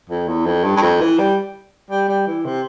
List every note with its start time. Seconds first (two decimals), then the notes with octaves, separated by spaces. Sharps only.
0.10 F2
0.28 E2
0.46 F2
0.64 G2
0.77 G2
0.82 F2
1.01 E3
1.19 G3
1.91 G3
2.08 G3
2.27 E3
2.45 C3